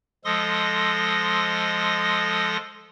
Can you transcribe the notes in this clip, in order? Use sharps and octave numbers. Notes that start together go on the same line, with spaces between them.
F3 G#3 A4 C6 D#6 A#6